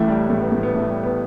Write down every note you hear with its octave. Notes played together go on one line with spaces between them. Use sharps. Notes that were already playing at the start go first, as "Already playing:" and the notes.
Already playing: A1 A2 E3 A3
G3
A3
B3
A3
B3
A3
G3
B3